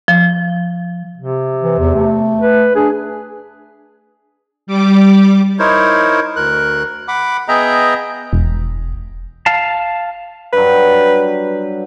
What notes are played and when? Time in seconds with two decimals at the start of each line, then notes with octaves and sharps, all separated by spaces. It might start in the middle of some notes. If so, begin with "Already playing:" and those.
0.08 F3
1.18 C3
1.62 E3
1.79 E2
1.95 A3
2.41 B4
2.75 D4 G#4
4.67 G3 D6
5.59 D#4 E4 A#4 C5 C#5
6.36 D2 A#4 F#6
7.08 F#5 B5 D6
7.48 B3 G#4 D#5 E5 G5 A#5
8.33 E1
9.46 F5 A5
10.53 G2 F#3 B4